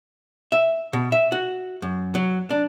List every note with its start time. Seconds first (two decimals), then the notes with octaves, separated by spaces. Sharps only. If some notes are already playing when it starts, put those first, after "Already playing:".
0.52 E5
0.93 B2
1.12 E5
1.32 F#4
1.82 F#2
2.15 F#3
2.50 D4